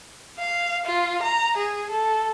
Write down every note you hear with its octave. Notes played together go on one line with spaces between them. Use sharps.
F5
F4
A#5
G#4
A4